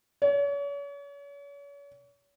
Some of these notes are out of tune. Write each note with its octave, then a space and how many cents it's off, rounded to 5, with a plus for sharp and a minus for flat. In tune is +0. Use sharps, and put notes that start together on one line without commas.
C#5 +40